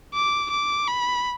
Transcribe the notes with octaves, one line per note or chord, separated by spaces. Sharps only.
D6
D6
B5